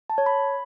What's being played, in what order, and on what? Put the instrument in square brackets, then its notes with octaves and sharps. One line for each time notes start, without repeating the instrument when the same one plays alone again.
[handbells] A5
C#5
B5